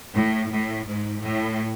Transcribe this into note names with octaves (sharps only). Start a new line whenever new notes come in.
A2
A2
G#2
A2